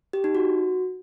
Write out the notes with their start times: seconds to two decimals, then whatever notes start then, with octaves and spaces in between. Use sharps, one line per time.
0.13 G4
0.24 D#4
0.35 F#4